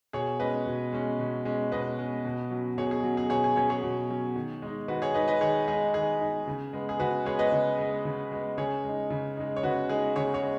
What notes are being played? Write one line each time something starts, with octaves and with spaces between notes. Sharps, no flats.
B2 G#4 C#5
G#3 C#4 B4 D#5
B2
G#3 C#4
B2
G#3 C#4
B2 B4 D#5
G#3 C#4
B2
F#3 C#4
B2 G#4 C#5
G#4
F#3 C#4
G#4
B2 G#4 C#5
G#4
F#3 C#4 G#4 C#5
G#4 C#5
B2
F#3 C#4
D#3
G#3 D#4
D#3 F#4 B4
G#4 C#5
D#4 B4 D#5
G#3
B4 D#5
D#3 G#4 C#5
G#3 D#4 G#4
D#3 G#4
G#3 D#4
C#3
G#3 B3
G#4
C#3 F#4 B4
G#3 B3 G#4 C#5
B4 D#5
C#3
G#3 B3
C#3
G#3 B3
C#3 G#4 C#5
G#3 D#4
C#3
G#3 D#4
C#5
C#3 F#4 B4
G#3 D#4 G#4
C#3 G#4 C#5
G#4 C#5
G#3